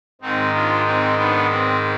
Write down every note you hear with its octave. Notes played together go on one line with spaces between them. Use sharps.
G#2 D#3 G#3 C4 D#4
D4 F4
C4 D#4
B3 D4
C4